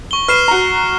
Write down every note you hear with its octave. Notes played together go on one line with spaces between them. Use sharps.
C#6 G7
B4 F6 C7 E7
F#4 A#5